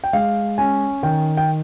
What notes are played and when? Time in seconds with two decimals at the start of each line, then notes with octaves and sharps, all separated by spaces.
0.04 G5
0.13 G#3 F5
0.58 C#4 G#5
1.03 D#3 G5
1.37 G5